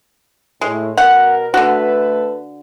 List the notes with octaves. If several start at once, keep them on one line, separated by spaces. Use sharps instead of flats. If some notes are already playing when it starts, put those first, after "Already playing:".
A2 G#3
B2 A#4 F#5
D3 A3 F#4 A4 B4